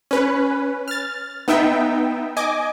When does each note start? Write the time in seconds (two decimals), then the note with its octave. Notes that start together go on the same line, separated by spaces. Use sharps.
0.11 C#4 B4
0.88 F6 A6
1.48 B3 D#4 E5 G5
2.37 D#5 G#5 D6